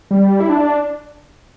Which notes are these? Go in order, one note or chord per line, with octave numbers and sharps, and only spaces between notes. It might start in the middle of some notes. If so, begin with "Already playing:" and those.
G3
E4
D4